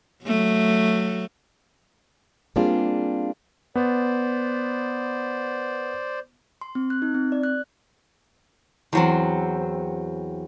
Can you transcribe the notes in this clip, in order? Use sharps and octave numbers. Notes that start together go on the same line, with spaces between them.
F#3 A3
G3 A#3 C4 D4 F4 G#4
B3 C5 D5
C6
C4
F#6
D#4
C4
D5
F#6
E2 F#3 C4